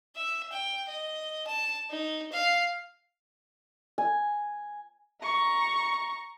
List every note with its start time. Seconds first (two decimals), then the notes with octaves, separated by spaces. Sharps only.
0.16 E5
0.52 G5
0.88 D#5
1.47 A5
1.90 D#4
2.32 F5
3.98 G#5
5.22 A#5 C#6